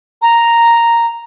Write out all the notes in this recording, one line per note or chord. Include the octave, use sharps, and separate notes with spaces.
A#5